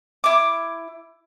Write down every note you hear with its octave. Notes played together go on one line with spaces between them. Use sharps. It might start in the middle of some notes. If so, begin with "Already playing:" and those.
E4 D6